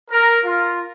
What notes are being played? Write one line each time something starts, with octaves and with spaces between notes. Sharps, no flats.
A#4
F4